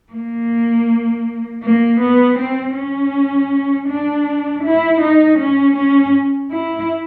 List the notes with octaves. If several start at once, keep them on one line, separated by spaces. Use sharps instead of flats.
A#3
A#3
B3
C4
C#4
D4
E4
D#4
C#4
C#4
E4